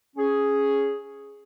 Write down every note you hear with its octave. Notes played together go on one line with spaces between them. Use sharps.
C#4 G#4